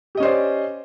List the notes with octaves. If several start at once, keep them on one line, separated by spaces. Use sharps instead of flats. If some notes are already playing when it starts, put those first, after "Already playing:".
C#4 G4 C5 D5 D#5